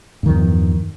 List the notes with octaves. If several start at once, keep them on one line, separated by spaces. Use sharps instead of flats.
E2 G2 D#3 F3